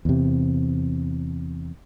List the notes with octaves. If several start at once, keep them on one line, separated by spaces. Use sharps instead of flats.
E2 C3